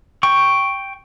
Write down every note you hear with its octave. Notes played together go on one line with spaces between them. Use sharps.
G5 C#6